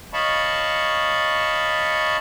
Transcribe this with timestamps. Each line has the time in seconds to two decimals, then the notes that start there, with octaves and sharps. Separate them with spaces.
0.13 C#5 D#5 F5 A5 B5 C#6